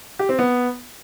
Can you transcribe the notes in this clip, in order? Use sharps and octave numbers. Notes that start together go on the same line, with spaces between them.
G4
C4
B3